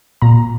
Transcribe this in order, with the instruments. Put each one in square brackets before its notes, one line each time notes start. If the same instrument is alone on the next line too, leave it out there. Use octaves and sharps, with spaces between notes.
[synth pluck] A#2 A#5